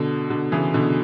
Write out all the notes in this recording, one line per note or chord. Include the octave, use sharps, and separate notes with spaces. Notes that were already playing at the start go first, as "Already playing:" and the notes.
Already playing: B2 D3
B2 D3
C#3 E3
B2 D3